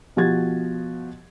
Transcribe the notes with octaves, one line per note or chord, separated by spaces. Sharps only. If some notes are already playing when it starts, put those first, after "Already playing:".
B2 F3 F#4 G4 G#6 A6